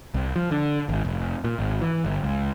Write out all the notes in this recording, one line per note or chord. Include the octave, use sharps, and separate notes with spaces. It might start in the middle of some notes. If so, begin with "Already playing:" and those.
C2
F3
D3
G#1
F1
A#2
G#1
E3
G1
C#2